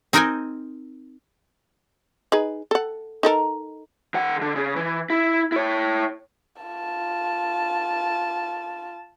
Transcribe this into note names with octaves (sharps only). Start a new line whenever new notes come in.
C4 D#4 A#4 D#5 G5 G#5
D#4 G#4 B4
A4 F#5
D#4 A4 A#4
D#3 F#5
D3
C#3
E3
E4
E4 C#5
F4 A5